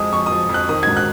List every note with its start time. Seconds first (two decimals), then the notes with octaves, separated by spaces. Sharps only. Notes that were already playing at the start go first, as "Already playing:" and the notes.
Already playing: F2 F3 G#3 D#6
0.12 F2 C#6
0.26 D#6
0.31 F3
0.49 F2
0.54 F#6
0.69 D#3 D#6
0.83 G#2 G#6
0.97 F#6